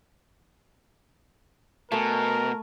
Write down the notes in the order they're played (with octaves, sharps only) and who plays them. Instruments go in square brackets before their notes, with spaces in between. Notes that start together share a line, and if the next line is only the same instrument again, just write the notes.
[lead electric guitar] B2 [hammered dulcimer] A3 G#5 [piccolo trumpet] A#4